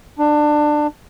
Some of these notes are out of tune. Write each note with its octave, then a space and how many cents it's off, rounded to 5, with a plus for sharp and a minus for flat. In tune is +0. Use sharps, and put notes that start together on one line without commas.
D4 +20